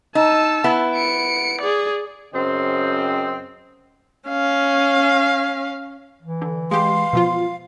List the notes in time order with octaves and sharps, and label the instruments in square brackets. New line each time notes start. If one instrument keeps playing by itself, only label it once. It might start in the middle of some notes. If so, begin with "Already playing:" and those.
[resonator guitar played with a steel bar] D#4 [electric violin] A5 E6
[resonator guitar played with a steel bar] B3 E4
[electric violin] C#7 D7
G#4 D5
[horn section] F#2 C#3 C4 C5 D#5 G5
[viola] C#4 F5
[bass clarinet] E3
[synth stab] D3
[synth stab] G#3 G4 [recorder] F5 [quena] C6
[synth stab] B2 F3 F4